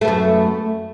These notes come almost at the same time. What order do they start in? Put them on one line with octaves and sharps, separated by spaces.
A3 B3 F#2